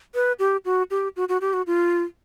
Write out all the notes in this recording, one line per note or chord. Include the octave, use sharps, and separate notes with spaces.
B4
G4
F#4
G4
F#4
F#4
G4
F#4
F4